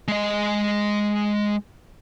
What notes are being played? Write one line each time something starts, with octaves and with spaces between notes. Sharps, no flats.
G#3 D#5